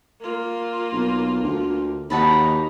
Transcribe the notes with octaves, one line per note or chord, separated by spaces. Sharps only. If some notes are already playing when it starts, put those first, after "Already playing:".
A#3 F4
B1
D2
D#2 A#3 D#4 F#4 A5 B5